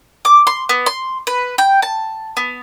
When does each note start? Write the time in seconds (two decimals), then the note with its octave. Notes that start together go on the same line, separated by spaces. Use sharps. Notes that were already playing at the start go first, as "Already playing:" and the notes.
0.25 D6
0.47 C6
0.69 B3
0.86 C6
1.27 B4
1.58 G5
1.82 A5
2.37 B3